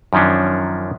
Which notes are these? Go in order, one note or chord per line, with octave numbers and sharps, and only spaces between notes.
F#2 D#3 F3 C#4 D4